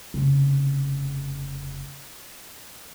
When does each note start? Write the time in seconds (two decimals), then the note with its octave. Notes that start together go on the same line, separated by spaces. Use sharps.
0.14 F1 C#3